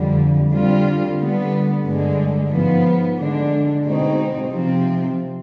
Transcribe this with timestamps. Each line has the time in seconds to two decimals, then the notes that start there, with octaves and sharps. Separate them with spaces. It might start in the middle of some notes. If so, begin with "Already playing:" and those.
Already playing: F2 D3 G3
0.51 D3 G3 C4 F4
1.17 D3 G3 B3
1.84 G2 D3 G#3
2.51 G#2 F3 B3
3.18 D3 G#3 D4
3.85 B2 G#3 C4 D#4
4.51 C3 F3 C4